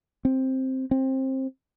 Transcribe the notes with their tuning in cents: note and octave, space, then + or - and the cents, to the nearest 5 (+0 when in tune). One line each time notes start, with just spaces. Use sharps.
C4 +5
C4 +20